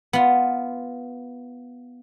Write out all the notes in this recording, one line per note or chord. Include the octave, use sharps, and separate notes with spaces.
B3 F4